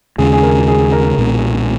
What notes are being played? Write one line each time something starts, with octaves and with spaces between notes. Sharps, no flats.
D#2 C#3 G#3 C#4 G#4
G#4
A#4
G#4
A#4
B1 A#2 G#3 B3